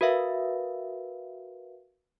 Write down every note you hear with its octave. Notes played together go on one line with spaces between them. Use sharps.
F#4 A#4 B4 E5 F5